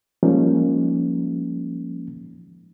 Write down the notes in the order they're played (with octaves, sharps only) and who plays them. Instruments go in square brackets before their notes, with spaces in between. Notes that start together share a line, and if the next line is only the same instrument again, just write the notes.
[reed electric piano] F3 G3 G#3 A#3 C#4 D#4